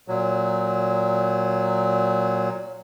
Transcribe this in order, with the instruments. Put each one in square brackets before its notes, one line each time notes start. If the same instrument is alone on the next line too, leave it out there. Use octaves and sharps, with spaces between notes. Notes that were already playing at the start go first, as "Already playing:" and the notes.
[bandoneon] A#2 F#3